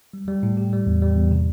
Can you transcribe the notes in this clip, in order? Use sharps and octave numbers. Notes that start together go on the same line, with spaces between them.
G3
G3
A2
G4
G3
E2
G3
E2
C3